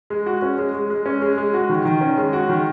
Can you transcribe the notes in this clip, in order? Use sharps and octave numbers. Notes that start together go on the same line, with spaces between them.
G#3
F#4
C#4
G#3
G#3
G#3
C#4
G#3
G#3
F#4
D#3
D#3
C#4
G#3
F#4
D#3